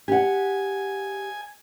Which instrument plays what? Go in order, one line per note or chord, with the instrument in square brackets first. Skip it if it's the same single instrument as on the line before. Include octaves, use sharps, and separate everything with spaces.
[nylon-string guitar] G4 F#5 [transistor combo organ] G#5